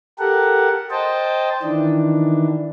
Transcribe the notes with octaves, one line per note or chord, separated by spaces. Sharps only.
G4 A4 A#4 F#5
C5 D#5 G5 A5
D#3 E3 D4